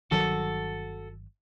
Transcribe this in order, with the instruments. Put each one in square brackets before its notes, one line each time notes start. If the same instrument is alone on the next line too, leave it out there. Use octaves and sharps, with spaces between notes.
[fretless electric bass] G1 D#3 F#3 [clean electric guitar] F#4 A4